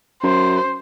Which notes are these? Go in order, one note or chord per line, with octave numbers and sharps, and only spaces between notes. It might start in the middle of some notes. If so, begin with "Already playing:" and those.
F#2 C5